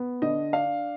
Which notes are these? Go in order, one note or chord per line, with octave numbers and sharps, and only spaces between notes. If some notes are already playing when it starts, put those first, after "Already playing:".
Already playing: B3
D3 D#5
D4 F5